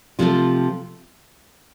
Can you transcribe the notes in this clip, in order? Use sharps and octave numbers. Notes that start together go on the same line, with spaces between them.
C3 F3 A3 F4